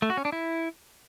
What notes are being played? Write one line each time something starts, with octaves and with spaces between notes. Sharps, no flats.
A3
F#4
C#4
D4
E4